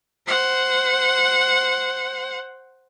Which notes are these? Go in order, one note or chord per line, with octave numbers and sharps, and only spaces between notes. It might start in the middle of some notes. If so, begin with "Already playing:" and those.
C5 F#5